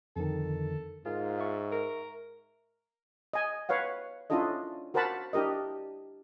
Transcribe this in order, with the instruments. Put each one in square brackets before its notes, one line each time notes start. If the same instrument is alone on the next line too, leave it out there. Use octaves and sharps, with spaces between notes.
[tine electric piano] F2 D3 D#3 [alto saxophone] A4
[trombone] G#2 [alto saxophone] F4 [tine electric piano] G#4 A#4
[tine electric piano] E5 C#6
[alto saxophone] A#4
[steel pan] D#5 G#5
B4 C#5 F5 F#5
C#4 D4 E4 F4 A4 D#5
F#4 A#4 C5 F#5 A5 B5
D4 E4 G4 A#4 D#5